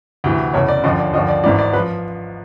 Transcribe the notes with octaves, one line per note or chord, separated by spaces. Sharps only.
D2 C3 E3
F1 E2 C#3 C#5
D5
D#2 D3 F3 D#5
D5
D#2 D3 F3 D#5
D5
G#1 G#2 E3 D5
D5
F3 B4